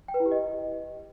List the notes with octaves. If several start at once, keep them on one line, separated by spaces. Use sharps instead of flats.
G5
B4
E4
G4
D#5